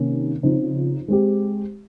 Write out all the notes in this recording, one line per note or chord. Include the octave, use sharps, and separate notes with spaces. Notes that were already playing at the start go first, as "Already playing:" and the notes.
Already playing: C3 D#3 A#3 C#4
C#3 F3 C4 D#4
G#3 C4 G4